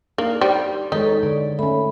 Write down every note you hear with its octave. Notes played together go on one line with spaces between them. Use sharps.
A#3 D4 D#4
G3 C5
D#3 G#3 D#4 A4 B4 C#5
D3 D5
A3 C#4 B5